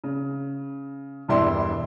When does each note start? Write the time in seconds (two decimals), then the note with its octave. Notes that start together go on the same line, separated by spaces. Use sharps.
0.04 C#3
1.28 E1 G2 G3 E4 C6